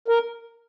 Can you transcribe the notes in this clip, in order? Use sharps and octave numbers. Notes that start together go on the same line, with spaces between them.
A#4